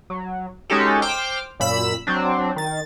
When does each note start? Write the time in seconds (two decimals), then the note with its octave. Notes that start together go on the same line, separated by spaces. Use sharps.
0.10 F#3
0.70 G#3 C#4 D#4 F#4 G4 A4
1.02 C5 G5 D6 F6
1.60 F#2 A#2 B5 E6 B6
2.07 F#3 C4 D4
2.56 D#3 A6